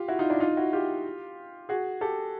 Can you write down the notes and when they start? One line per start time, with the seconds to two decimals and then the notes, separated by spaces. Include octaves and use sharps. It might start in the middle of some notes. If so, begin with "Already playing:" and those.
Already playing: F4 G4
0.08 E4 F#4
0.19 D#4 F4
0.30 D4 E4
0.40 D#4 F4
0.57 E4 F#4
0.73 F4 G4
1.69 F#4 G#4
2.01 G4 A4